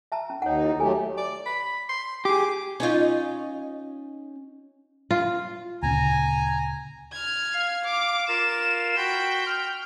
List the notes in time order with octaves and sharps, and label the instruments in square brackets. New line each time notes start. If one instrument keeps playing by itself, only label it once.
[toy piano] E5 A5 A#5
C#4
[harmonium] D#2 D#4 [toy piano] C#5 F#5
[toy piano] E4
[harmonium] F#3 A3 G4 [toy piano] A4 G#5
[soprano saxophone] D5
B5
C6
[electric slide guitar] G4 G#4 [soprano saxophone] D6
[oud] C#4 D#4 F4
[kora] F4
[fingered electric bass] D2 A#2 C#3 [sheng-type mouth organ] G#5 A#5
[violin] F6 G#6
[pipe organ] F5
[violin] D6
[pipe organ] F4 A#4 F5 [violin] E7
[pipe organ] F#4 B5 C6 [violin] G5
[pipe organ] F6